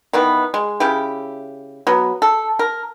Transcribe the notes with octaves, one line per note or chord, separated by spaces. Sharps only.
D#3 E3 B3
G#3
C#3 E4 G4
F#3 B3
A4
A#4